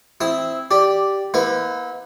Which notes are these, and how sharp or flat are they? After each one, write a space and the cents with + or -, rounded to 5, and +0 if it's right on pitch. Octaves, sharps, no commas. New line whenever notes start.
C4 +0 E4 +0 D#6 +15
G4 -5 D5 +0
B3 -45 E4 -20 B4 +40